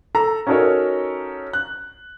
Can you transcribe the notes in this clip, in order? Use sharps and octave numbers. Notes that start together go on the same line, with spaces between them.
A4 A#5
C#4 D#4 F#4 A4 A#4 C#5
F#6